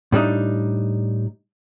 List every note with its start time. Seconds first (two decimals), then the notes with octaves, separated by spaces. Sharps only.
0.12 A2 G3 D4 D#4